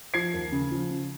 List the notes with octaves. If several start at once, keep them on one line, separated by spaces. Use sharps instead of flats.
F3 G#6 C7
D#2
C#3
F3
C#3